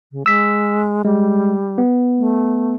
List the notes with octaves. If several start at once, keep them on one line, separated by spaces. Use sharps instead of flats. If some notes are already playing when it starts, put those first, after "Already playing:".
C#3
G#3 E6 B6
G3 G#3
B3
A3